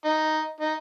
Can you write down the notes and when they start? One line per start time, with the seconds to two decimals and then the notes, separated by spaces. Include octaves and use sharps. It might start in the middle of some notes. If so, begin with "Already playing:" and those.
0.05 D#4
0.61 D#4